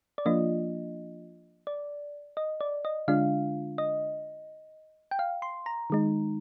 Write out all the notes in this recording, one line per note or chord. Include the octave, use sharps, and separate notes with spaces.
D5
F3 A#3 D4 F4 D#5
D5
D#5
D5
D#5
D3 G#3 D4 F4 F5
D#5
G5
F5
C6
A#5
D#3 G#3 D#4